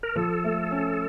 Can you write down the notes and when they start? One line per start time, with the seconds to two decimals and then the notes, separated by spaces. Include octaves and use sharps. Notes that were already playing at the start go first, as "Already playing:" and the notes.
0.03 A#4
0.16 F3 A4
0.44 A3
0.71 C#4